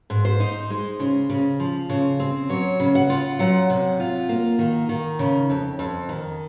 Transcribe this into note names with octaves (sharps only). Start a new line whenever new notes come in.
G#2
C5
D#4
G#3
C#3
C#3
F3
C#3
C4
F#3 C#5
C#3
F#5
F4
F#3 F#5
C3
F4
A#3
D#3
D#3
C#3
F2
F2
D#3